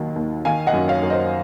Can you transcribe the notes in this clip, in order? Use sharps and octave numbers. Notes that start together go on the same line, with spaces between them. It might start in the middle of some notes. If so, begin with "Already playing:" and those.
Already playing: D#2 D#3 F#3
D#2
D#3 F5 G#5
D#5 F#5
F#2
C#5 F5
F#2
C5 D#5